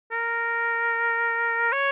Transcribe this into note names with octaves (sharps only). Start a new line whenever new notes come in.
A#4
C#5